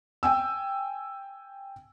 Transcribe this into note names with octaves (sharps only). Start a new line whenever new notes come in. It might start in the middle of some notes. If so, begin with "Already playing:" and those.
G5 G#5 E6